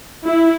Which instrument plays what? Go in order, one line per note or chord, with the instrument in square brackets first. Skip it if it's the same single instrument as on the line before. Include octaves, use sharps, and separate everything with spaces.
[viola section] E4